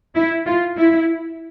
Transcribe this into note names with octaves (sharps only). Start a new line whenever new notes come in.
E4
F4
E4